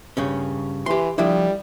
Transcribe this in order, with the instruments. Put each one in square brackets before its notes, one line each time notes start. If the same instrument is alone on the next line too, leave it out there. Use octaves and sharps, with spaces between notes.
[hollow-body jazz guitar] G2 C#3 C#4
[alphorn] E3 [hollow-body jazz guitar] G4 C6
[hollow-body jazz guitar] F3 D4 E4 [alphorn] G3